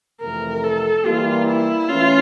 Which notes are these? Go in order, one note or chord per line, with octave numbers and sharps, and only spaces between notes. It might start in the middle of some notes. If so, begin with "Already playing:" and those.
F2 C3 E3 A3 A#4
A4
E3 G3 A#3 F4
E4
E3 A3 C#4 F4